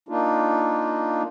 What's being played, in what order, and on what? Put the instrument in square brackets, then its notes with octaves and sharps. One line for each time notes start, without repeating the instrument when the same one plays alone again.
[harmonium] A#3 D4 D#4 F4